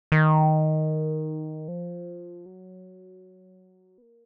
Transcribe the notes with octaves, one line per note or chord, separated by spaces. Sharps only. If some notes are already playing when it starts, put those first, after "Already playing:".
D#3
F3
F#3
B3
A#3